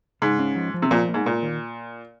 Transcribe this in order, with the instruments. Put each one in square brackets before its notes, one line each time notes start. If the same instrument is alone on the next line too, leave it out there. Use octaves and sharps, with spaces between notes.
[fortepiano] G#2 [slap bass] C#3
[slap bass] C#4
F3
F3
[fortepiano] C3
[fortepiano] A#2 [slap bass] F3
[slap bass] A#3
[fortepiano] G#2
[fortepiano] A#2 [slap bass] A#3
[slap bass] D#3